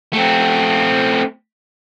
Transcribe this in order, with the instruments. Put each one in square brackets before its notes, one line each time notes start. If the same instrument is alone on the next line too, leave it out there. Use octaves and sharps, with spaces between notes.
[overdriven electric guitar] A3 C4